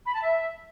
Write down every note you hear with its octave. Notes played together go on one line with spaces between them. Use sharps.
B5
A5
E5